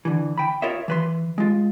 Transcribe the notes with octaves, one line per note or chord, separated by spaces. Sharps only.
D3 E3
G5 B5
F4 A#4 C#5 D#5 E5
E3 B4 C6
G#3 F4